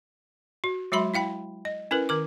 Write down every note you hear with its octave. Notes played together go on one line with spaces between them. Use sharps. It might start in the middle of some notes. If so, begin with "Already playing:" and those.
F#4
F#3 G#3 F#4 E5 B5 C6
E4 F5 G5 B5
D#5
C#4 E4 A#4 B4
D#3 A#4 D6